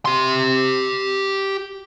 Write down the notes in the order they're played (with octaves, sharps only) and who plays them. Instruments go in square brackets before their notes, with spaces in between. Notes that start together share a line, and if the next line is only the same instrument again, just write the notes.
[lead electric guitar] G4 C6